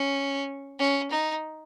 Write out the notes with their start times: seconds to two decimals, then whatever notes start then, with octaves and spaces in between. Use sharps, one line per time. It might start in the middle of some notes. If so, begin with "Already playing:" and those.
Already playing: C#4
0.79 C#4
1.11 D#4